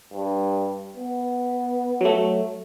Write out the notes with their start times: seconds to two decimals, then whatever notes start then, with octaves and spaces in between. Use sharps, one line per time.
0.13 G2
0.97 B3
2.01 F#3 A3